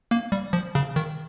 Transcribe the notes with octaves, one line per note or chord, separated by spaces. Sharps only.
A#3
G3
F3
C#3
D#3